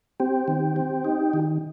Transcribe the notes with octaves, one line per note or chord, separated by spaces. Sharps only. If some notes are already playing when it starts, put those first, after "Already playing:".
C4 G4
D#3
C4
D#4
D#3